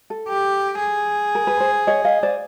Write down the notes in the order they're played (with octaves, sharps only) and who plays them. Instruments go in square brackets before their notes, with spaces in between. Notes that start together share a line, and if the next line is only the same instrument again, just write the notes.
[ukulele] A4
[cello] G4
G#4
[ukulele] A#4
B4
C5
C#5 D#5
D#5 F5
C5 D5